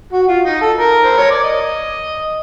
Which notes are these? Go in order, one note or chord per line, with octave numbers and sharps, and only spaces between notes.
F#4
F4
D#4
A4
A#4
C5
C#5
D5
D#5